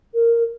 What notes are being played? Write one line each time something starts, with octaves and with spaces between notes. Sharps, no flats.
A#4